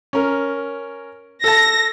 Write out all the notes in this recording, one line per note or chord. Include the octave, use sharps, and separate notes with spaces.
C#4 A#4
A4 A5 A#6